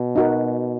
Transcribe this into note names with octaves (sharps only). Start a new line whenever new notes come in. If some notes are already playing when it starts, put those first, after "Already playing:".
Already playing: B2
D#4 F#4 A#4